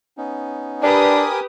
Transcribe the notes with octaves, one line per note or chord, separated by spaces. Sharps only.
B3 C#4 D#4
D4 G4 A#4 B4 G#5 D6 D#6